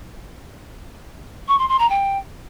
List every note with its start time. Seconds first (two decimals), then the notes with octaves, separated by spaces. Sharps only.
1.47 C#6
1.58 C6
1.68 C6
1.79 A#5
1.89 G5